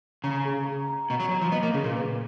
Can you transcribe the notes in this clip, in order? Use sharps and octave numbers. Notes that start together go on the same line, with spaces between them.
C#3 A#5
G#4
A#5
A#5
B2 A#5
F#3
F#3 A#5
F3
B3 D#5
A#3
C#3 G#4
A#2
B4